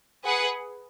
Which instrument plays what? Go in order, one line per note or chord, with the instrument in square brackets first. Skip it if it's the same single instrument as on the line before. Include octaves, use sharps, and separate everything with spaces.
[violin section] G#4 B4 F#5